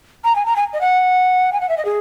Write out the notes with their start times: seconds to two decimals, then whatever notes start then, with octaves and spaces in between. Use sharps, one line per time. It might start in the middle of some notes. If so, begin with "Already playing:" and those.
0.24 A#5
0.36 G#5
0.46 A#5
0.56 G#5
0.73 D#5
0.81 F#5
1.53 G#5
1.61 F#5
1.69 E5
1.77 D#5
1.85 G#4